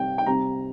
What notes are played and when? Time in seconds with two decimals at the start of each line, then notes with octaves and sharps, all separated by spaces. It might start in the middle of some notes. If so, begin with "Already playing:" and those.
Already playing: C3 G3 C4 G5
0.18 G5
0.26 C3 G3 C4 A#5